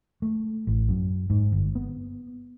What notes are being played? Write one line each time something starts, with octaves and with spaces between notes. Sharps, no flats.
A3
A1
F#2
G#2
G1
B3